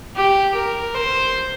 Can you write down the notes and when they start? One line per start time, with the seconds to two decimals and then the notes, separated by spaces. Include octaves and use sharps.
0.16 G4
0.55 A#4
0.95 C5